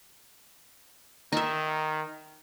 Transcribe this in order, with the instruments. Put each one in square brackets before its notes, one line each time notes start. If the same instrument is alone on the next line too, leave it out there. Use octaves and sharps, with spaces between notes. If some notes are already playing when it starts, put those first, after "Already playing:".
[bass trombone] D#3 [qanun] D#4 E5